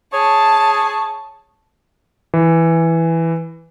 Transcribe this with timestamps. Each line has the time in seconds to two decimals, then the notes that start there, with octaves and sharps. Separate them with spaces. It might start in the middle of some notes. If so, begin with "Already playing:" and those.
0.13 G#4 C#5 A5
2.34 E3